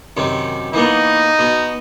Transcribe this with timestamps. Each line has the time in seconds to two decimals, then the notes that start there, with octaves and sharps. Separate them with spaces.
0.17 F#2 C3 D#3
0.73 E3 A#3 B3 D#4
1.39 B2